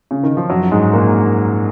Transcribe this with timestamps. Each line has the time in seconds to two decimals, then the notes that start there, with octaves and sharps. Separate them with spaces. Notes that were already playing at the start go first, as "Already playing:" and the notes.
0.11 C#3
0.23 D#3
0.37 F3
0.50 F#2 F#3
0.71 G#2 G#3
0.93 A#2 A#3